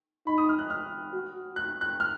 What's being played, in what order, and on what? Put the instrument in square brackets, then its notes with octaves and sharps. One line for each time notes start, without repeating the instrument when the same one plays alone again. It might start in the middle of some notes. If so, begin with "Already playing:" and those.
[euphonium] D#4 [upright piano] B5
[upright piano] D#6
F6
F#6
F6
[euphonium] F#4
[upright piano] F#6
F#6
F6